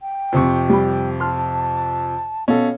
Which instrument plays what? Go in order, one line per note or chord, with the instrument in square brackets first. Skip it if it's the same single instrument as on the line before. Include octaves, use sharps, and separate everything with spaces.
[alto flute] G5
[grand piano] F2 C3 C#6 [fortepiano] C4 C5
[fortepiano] G3 B5
[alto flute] A5 [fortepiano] C6 F6
[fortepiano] B2 [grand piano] C#4 A4 [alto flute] F5